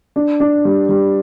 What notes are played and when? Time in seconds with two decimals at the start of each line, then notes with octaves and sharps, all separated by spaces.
0.16 D4
0.40 D4
0.65 G3
0.89 G3